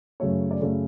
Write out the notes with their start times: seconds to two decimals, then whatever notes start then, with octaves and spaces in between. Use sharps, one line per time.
0.20 F#2 C#3 F#3 A3 C#5
0.51 D5
0.60 F#2 C#3 F#3 A3 C#5